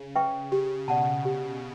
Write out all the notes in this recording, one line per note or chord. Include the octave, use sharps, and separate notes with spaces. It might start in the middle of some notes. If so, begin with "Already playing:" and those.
Already playing: C#3
B4 E5 G5 C#6
C#3 G4
B2 D5 F#5 A5
G4